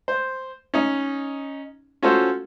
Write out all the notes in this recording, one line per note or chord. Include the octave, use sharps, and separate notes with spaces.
C5
C#4 D#4
C#4 F4 F#4 A4 C5